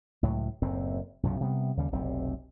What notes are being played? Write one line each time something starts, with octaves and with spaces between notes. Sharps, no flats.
C#2 A2 F#3
F#1 F#2 A2 C4
B1 F#2 A#2 C#3
C3 G3 B3
D#2 C#3 G3
F1 B1 C3 C4